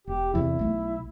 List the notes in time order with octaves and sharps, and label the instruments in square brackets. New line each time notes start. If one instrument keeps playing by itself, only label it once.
[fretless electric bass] E1 [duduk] G4
[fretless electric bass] E2 C3 [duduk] E4
[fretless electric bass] B1 A3